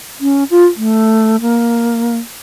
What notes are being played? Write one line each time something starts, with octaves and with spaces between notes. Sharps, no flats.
C#4
F4
A3
A#3